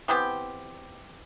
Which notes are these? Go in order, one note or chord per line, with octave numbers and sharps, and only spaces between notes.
E3 B3 C4 G4